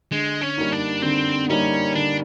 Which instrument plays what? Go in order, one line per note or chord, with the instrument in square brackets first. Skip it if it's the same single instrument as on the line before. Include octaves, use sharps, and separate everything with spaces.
[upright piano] D3 [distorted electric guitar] G#3
[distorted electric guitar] C#4
[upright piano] G3 A#3 D#4
[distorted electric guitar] D4
[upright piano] D3 [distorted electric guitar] C4
[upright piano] G3 A#3 D#4 [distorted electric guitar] C#4
[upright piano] D3 [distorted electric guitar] D4